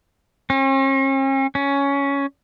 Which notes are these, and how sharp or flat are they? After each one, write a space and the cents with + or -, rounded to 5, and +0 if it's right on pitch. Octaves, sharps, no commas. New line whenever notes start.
C#4 -45
C#4 +10